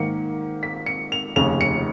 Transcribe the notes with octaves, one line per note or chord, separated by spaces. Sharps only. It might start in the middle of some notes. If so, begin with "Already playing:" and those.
Already playing: G#2 D#3 A#3 C#7
B6
C#7
F7
F1 D#2 C#3 F7
C#7